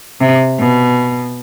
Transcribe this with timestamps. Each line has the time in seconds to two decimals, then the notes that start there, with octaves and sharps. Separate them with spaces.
0.21 C3
0.59 B2